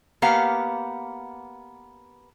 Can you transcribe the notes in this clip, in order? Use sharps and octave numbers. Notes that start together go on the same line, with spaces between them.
A#3 B3 G4 F5 F#5